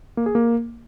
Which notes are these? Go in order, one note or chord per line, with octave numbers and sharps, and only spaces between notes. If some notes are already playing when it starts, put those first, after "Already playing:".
A#3
G#4
A#3